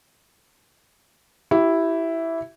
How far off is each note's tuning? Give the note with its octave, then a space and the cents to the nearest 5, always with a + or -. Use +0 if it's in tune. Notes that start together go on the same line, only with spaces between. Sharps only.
E4 +0 G4 -30